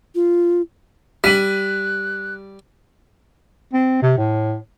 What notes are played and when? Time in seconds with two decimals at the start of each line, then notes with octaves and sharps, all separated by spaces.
0.15 F4
1.24 G3 F#6 B6 D#7 F#7
3.73 C4
4.02 C3
4.17 A2